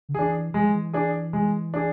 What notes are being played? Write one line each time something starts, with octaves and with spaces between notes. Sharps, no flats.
D3
E3 D4 G#4
E3 G#3
F3
E3
D4 G#4
G#3
D4 G#4